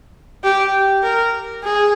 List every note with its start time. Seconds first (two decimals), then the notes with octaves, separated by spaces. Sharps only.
0.44 G4
1.03 A#4
1.64 G#4